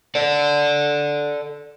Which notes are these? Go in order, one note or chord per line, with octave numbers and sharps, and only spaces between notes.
A4 D5